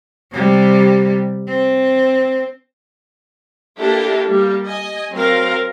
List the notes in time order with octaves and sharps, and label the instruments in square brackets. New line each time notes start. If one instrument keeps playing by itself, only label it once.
[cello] C3 G3
C4
[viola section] A#3 D4 E4 G4 A4
G3 A#3
D#5 G#5
F#3 C4 A#4 F5